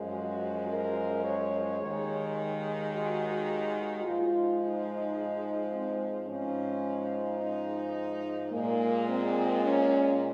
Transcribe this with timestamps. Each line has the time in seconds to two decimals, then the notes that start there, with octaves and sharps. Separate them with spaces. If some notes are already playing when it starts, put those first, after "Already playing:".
Already playing: F#2 F3 G#3
0.12 F#4
0.69 A#4
1.25 C#5
1.81 D#2 D#3 G#3
2.92 F#4
4.04 G#2 F3 G#3 F4
4.59 D#4
5.71 C4
6.28 G#2 F3 G#3 C#4
7.39 D#4
8.51 A#2 G#3 A#3
9.07 C4
9.62 C#4